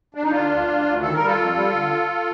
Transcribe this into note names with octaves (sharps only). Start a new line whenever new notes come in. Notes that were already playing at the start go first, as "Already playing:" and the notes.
D4
D#4
D3 D4 F4
D2
D2
D2
D#3 A4
A#4
G3
F4 A4
F2
G3
D3